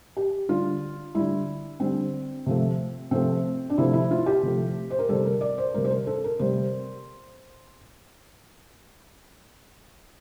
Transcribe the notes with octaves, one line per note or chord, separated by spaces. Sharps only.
G4
D3 G3 F4
D3 G3 E4
D3 G3 C4
C3 F3 A3
C3 F3 A3 C4
D4
C3 F3 A3 E4
E4
F4
G4
C3 F3 A3
C5
A#4
C3 G3 A4
A#4
D5
C5
C3 G3 A#4
C5
A#4
A4
A#4
C3 G3 C5